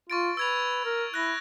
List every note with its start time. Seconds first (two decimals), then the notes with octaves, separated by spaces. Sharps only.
0.10 F4 C#6 A6 D7
0.37 B4 E6 G#6 F7
0.85 A#4
1.14 E4 F#6 A#6